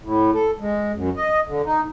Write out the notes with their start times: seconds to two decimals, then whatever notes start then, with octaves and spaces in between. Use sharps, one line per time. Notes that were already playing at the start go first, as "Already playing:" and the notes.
0.03 A2
0.34 A4
0.60 G#3
0.94 F#2
1.17 D#5
1.48 D3
1.65 D#4